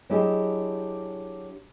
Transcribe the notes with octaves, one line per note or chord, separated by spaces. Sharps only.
F#3 D4 E4 G4 G#4 D#5